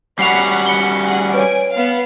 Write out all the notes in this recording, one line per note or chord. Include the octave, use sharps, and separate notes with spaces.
G3 C#4 F#4 F#5 B5 C7 F7
C#7 G7
G#4 F#5
B4 C#5 G#5 D7
B3 F5